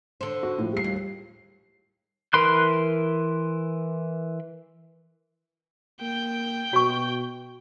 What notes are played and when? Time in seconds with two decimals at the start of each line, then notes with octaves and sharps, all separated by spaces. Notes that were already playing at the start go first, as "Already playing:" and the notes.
0.21 D3 C5
0.43 F#4
0.58 A2 F3
0.73 G3 C7
0.84 D#2
2.33 E3 A#4 B5 C6 F#6
6.01 A#3 G5 G6
6.73 B2 F#4 C#6